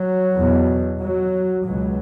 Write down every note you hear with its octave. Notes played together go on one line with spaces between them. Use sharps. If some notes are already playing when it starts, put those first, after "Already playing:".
Already playing: F#3
E2 B2
F#3
C#2 B2 F#3